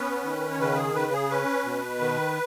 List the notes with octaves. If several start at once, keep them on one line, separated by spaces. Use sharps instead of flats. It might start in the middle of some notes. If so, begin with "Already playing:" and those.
Already playing: B3 C#4 B4
D#3
C#5
C#3 B4
G#4
C#3 B4
G#4
C#4 B4
B2
D#3